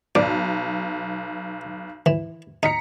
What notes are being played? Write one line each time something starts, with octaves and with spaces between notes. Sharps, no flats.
B1 D5
E3
D#4 A#5 B6 C#7